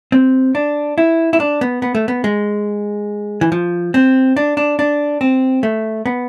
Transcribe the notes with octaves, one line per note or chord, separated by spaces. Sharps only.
C4
D4
E4
E4
D4
B3
B3
A3
B3
G#3
E3
F3
C4
D4
D4
D4
C4
A3
B3